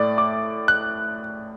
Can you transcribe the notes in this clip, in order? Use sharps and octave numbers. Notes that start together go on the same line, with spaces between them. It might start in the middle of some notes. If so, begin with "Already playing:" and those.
Already playing: A2 A3 D5
D6
F#6